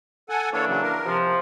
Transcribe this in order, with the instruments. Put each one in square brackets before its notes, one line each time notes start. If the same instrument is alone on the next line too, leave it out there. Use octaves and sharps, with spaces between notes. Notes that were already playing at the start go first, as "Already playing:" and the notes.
[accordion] A4 F#5 G#5
[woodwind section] E3 A#3 D4 [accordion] A4 C#5
[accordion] C#3 F#3
A#4
[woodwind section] C3 F3